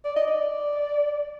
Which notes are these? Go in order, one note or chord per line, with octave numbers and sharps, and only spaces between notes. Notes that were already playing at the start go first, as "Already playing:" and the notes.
D5
D#5
D5